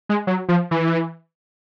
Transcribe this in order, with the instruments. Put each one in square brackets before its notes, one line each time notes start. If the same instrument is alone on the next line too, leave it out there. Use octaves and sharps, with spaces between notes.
[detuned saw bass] G#3
F#3
F3
E3